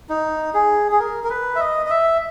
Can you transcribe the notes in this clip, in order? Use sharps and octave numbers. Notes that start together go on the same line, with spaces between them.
D#4
G#4
G#4
A#4
A#4
B4
E5
D#5
D#5
E5